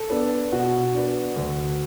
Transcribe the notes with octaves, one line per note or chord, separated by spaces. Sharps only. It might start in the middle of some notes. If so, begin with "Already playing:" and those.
Already playing: A4
B3 D4
B2 F#4
B3 D4
D2